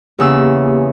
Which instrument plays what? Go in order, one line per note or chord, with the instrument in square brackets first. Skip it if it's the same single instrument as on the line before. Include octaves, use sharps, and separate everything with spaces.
[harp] E2 C#3 E6 [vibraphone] A#3 G4